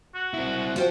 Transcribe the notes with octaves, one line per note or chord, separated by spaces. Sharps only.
F#4
C4 E4
F3 F4 F#4 C5 G5